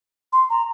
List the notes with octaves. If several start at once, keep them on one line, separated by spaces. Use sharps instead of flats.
C6
A#5